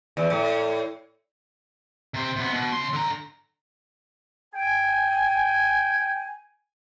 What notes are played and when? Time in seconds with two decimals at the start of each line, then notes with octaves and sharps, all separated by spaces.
0.17 E2
0.30 A2
2.14 C3 C5
2.36 C3 B3
2.52 B2
2.73 C#3 C6
2.93 D3 A#5
4.54 G5 G#5